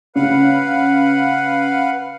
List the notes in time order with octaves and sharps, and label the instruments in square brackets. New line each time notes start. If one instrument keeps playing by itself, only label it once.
[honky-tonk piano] C#3 [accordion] B4 F5 F#5